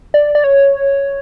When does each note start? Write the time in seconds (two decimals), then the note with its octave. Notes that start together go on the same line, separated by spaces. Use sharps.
0.14 D5
0.35 D5
0.44 C#5